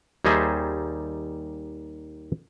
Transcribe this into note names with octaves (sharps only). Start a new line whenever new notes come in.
D#2 G3 D#4 G#4 C5 E5